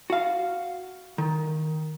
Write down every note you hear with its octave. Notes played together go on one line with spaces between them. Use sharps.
F#4 F5
D#3